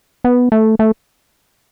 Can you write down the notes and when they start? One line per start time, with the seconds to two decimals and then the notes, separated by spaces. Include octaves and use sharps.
0.24 B3
0.52 A3
0.79 A3